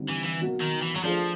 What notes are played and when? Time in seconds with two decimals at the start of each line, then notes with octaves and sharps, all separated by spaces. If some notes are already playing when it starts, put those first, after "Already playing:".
Already playing: D3 G3 C4 D#4 G4
0.09 E3
0.25 E3
0.41 B2 F#3 A#3
0.61 D#3
0.82 E3
0.96 F#3
1.03 F3 A3 D4 F4 G#4 C5